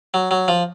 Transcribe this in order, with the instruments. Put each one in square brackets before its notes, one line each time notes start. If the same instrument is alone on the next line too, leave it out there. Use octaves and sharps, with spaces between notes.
[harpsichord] F#3
F#3
F3